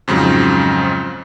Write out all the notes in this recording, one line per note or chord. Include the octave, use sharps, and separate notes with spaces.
F2 G#2 C#3 F3 F#3 C4